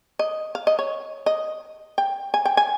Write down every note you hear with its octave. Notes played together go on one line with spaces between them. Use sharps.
D#5
F5
D#5
C#5
D#5
G5
G#5
G5
G#5